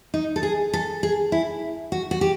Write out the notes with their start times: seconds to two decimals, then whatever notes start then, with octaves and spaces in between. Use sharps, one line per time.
0.14 D#4
0.36 A4
0.43 G#4
0.73 A4
1.03 G#4
1.32 E4
1.92 F#4
2.11 F#4
2.21 G4